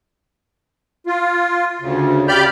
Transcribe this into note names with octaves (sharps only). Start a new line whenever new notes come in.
F4
D2 C#3
C#3 G4 D5 B5 F6 G6